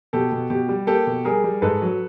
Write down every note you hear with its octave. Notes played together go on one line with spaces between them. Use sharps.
B2 G4 A4
B2
B2 G4
G3
A#3 G4 A4
B2
G3 G#4 A#4
G3
G#2 A4 B4
F#3